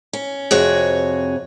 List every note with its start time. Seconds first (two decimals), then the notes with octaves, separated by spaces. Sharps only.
0.13 C#4
0.51 F2 C3 F#4 G#4 C#5